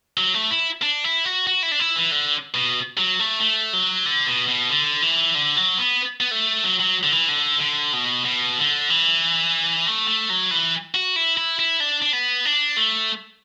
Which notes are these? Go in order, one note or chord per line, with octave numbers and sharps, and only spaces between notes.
F#3
A3
E4
D4
E4
F#4
F#4
E4
D4
E4
E3
D3
B2
F#3
A3
A3
F#3
D3
B2
B2
D3
E3
D3
F#3
B3
B3
A3
F#3
F#3
D3
E3
D3
D3
B2
B2
D3
E3
A3
A3
F#3
E3
F#4
E4
E4
E4
D4
D4
B3
D4
A3